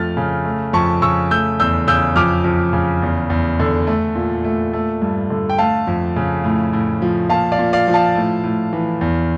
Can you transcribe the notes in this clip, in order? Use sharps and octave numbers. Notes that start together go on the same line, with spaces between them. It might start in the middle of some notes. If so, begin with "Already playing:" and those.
Already playing: F2 A3 F6 A6
C#3
A3
F2 A5 C#6
C#3 C#6 E6
A3 E6 G6
E2 E6 G6
C#3 E6 G6
F2 D6 F6
F2
C#3
E2
E2
D3
A3
A#2
A3
A3
G2
D3
G5
A3 F5 A5
F2
C#3
A2
A2
F3
A#2 F5 A5
D5 F5
A#2
D5 F5
F3
F5 A5
A2
A2
E3
E2